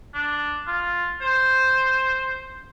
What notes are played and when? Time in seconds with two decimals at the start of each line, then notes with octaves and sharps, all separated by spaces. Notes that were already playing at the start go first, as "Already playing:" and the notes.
0.14 D4
0.67 F4
1.21 C5